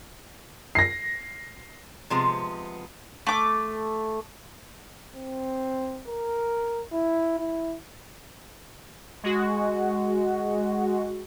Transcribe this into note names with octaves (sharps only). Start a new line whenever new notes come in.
A#6 C7
C3 F3 G#3 B3
A3 D6
C4
A#4
E4
E4
G#3 F#4